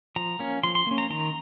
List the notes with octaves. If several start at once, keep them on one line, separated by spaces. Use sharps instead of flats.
F3 A#5
A#3 C#4
F3 C6
C6
A#3 C#4
A#5
D#3 A#5